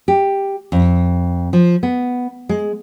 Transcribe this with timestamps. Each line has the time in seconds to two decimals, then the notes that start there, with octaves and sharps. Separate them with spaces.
0.08 G4
0.72 F2
1.53 F3
1.83 B3
2.49 G#3